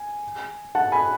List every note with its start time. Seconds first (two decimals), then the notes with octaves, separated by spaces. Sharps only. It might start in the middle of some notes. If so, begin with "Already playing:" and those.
Already playing: G#5
0.75 F#5 A5
0.92 G#5 B5